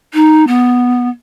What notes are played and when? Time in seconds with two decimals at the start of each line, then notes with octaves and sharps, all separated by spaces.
0.14 D#4
0.47 B3